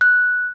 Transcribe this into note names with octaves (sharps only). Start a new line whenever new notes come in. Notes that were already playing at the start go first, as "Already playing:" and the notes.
F#6